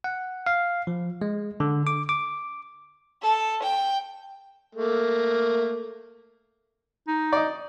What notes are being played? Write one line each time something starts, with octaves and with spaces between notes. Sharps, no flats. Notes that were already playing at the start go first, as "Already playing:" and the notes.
F#5
F5
F3
G#3
D3
D6
D6
A4
G5
A3 A#3
D#4
D5 D#5